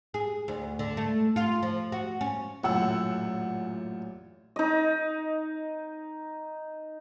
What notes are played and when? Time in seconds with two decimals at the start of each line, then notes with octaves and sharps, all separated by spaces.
0.14 G#4
0.48 D2
0.79 D3
0.97 A3
1.36 F4
1.63 F3
1.92 F#4
2.21 C#4
2.64 A1 F#2 A#2 F#5 E6
4.56 D#4 D#5